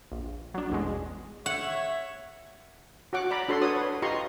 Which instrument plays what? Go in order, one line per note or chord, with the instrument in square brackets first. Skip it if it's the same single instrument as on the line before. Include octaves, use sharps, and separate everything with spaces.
[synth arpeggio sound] A#1
F#3 D4
A1 E2 B2 G#3
[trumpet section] C#5 E5 [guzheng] F#5
[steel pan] F#4 C#5 F#5 D6
D5 A#5 B5
D4 F#4 A4 C#5 C6
B4 C#5 D#6
B4
F4 G4 D#5 A#5 C6 C#6